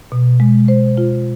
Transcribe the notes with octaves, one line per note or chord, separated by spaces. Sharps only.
B2
G#3
C5
F4